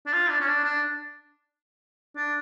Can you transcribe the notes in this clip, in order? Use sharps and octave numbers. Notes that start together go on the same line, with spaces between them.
D4
F4
D4
C#4
D4
D4
D4